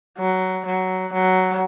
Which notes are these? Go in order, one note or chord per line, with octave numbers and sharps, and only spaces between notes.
F#3
F#3
F#3